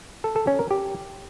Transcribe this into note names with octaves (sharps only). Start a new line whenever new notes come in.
A4
A4
C#4
A#4
G4